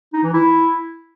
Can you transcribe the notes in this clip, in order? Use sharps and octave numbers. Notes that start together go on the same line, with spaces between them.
D#4
E3
E4